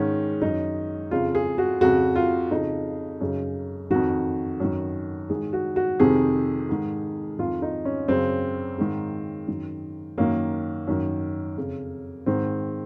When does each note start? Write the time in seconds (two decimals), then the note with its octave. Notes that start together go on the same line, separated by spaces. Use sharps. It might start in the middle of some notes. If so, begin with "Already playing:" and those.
Already playing: G#2 D#3 C#4
0.42 F#2 D#3 D#4
1.11 F2 C#3 F4
1.35 G#4
1.58 F#4
1.81 F2 C#3 F#4
2.16 F4
2.51 F2 C#3 D#4
3.21 F#2 C#3
3.90 F2 D#3 F#4
4.60 F#2 D#3
5.30 G#2 D#3 G#4
5.53 F#4
5.76 F#4
5.99 F2 C3 D#3 G#4
6.69 G#2 D#3
7.39 F2 D#3 F4
7.62 D#4
7.85 C#4
8.08 F#2 C#3 C4
8.78 G#2 D#3
9.48 F#2 D#3
10.18 F#2 D#3 A#3
10.87 F#2 D#3
11.57 F2 C#3
12.26 G#2 D#3 C4